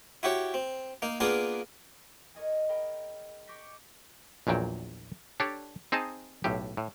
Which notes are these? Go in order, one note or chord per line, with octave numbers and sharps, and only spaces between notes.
E4 F#4 G4 C#5
C4
A#3 D#4
A#3 B3 D4 F4 G#4 A#4
A#4 C#5 D#5 G#5
G#4 A#4 G5 B5
C#6 D6 G6 A#6 B6
A#1 E2 A#2 F#3 G5
D4 G4 A4 C#5 D5
C4 D#4 G#4 D#5 A5
B1 A2 G4
A2